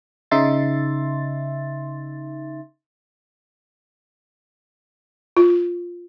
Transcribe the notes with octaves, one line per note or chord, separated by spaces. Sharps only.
C#3 D#4 E5 C6 A6
F4